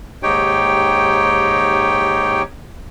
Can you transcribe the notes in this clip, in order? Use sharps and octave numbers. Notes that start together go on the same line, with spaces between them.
D#2 G#2 D#4 G4 C#5 G5